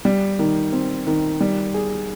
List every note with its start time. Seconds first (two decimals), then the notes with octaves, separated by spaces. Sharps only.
0.05 G3
0.39 D#3
0.72 C4
1.07 D#3
1.41 G3
1.74 G#4